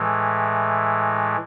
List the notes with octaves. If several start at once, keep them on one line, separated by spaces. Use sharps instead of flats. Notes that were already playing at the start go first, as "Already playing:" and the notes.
Already playing: A2 E3 G#3